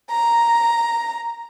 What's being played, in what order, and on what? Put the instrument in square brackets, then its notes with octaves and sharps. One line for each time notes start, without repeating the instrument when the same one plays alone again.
[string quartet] A#5